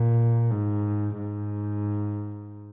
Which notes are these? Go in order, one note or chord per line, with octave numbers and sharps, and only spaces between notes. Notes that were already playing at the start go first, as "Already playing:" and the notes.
Already playing: A#2
G#2
G#2